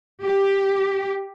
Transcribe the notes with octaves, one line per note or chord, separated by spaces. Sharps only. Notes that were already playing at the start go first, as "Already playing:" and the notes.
G4